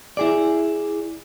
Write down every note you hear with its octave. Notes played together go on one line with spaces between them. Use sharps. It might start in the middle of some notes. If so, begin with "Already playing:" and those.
E4 G#4 D5